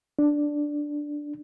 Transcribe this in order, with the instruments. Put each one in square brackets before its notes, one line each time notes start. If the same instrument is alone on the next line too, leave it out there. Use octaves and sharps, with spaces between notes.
[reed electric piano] D4